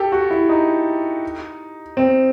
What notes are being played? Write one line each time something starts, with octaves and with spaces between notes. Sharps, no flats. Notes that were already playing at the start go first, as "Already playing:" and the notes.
Already playing: G4 A4
F#4
E4
D#4
C4